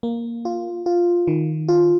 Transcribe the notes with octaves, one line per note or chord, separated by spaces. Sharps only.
A#3
F4
F4
D#3
F4